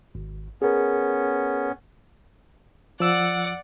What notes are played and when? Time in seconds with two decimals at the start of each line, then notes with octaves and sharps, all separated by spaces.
0.15 G#1
0.62 B3 C#4 G#4 A#4
3.00 F3 D5 F#5 E6